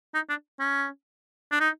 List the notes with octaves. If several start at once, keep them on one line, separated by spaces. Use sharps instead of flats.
D#4
D4
C#4
D4
D#4